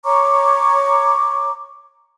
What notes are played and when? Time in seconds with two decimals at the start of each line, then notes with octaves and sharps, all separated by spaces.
0.04 C#5 A#5 C#6 D6